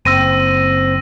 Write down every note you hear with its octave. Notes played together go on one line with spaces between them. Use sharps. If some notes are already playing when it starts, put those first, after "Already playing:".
F#1 C4 E6 A#6 D#7